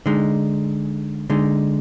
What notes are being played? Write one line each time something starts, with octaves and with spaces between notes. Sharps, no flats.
D3 G#3 D#4
D3 G#3 D#4